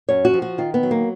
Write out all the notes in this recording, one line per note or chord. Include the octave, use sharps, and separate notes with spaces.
F#2 C#5
F#4
F3
F#4
D#3 F4
B3
F#3
A#3